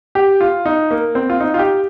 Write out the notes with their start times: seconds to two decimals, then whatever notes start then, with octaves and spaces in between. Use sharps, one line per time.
0.15 G4
0.41 F4
0.66 D#4
0.91 A#3
1.15 C4
1.30 F4
1.40 D#4
1.54 F4
1.59 G4